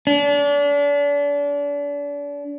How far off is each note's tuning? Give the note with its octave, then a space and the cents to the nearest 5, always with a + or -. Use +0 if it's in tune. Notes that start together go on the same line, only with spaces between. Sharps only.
D4 -35